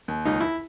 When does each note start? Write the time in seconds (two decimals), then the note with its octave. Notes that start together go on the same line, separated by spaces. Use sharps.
0.08 D#2
0.25 C#2 D#4
0.41 E4